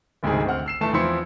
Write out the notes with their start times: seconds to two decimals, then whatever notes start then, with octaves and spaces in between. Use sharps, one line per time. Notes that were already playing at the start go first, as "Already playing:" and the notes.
0.23 F#1 D2 G#2 C3 G#4
0.46 D2 C4 F#5 F6
0.66 E6 C7 E7
0.81 G1 E3 A3 E5 A5 E7
0.93 E2 F3 C4 E4 C6 C#7